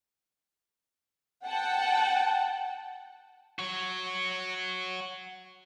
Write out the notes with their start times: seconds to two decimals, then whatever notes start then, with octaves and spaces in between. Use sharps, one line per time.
1.46 F#5 G5 A5
3.59 F#4 C#5